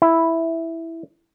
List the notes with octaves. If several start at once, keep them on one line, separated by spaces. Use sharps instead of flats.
E4